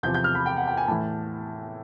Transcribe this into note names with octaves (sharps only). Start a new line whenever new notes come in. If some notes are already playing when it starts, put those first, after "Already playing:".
E2 C3 F3 G6
G6
F6
B5
G5
F#5
G5
G#5
A2 E3 A5